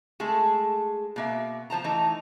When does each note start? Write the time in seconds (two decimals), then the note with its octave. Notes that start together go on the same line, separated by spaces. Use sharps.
0.20 G#3 A3 G#4 A4
1.16 B2 A#3 E5
1.70 F3 C5 A5 A#5
1.84 E3 A3 D#4 A#5